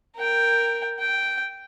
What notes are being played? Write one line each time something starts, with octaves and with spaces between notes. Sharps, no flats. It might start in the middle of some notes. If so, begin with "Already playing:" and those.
A#4 G5
G5